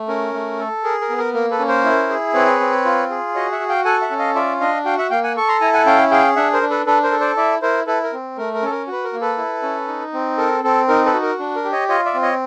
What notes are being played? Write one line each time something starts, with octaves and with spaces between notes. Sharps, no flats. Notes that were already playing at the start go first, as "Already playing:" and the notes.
Already playing: A3
C#4 A#4
A3
A4
G#4 A#4
A#4
B3
A#4
A#3 A#4
A4 B4
C#4
A#4 C5
E4
G#4
C4 B4 C#5
C4
F4
G#4
F#4 C#5 D#5
E5 F#5
F#4
F5 G5
A4 F#5 G#5
E5 F#5
C#4
D#5 F5
F4 D5 E5
D4 D#5 F5
F#4 F5 G5
E5 F#5
A#3 F5 G5
F#5 G#5
A4 C#6
A#5 C6
E4 G#5 A#5
F#5 G#5
C#4 F5 G5
G#4 F5 G5
D4 E5 F#5
A#4 C5
D4
A4 B4
D4 A4 B4
A#4 C5
A4
C5 D5
E4 D5 E5
E4 A#4 C5
E4 A4 B4
A#4
C4
A3 A#4
A#4
C#4 A4
A#4
F#4 B4
A#4
A#3
A4 B4
E4
C#4
D#4
C4
A4 A#4
C4 A4
D#4 A#4
A4 B4
F#4
A#4
D4
A#4
G4
C#5 D#5
F4 C#5 D#5
D5 E5
C4
C#5 D#5